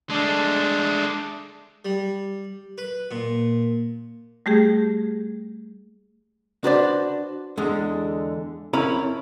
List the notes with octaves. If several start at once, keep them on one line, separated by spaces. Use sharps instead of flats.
G#3 A3 D4
G3
B4
A#2
G3 A3 G4 G#4
D4 F#4 B4 C5 D5
E2 D3 G#3
F2 C#4 E4 A#4 F5 B5